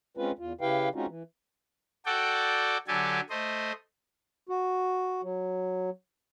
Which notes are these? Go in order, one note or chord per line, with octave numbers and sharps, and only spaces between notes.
G#3 C4 C#4 F4 B4
E2 F4
C#3 E4 G4 B4 F5 G5
G#3 C4 C#4 D#4 F4 F#4
E3
F#4 A4 D5 G5
D3 F#3 G4 A4 G#5
A3 C5 D#5
F#4
F#3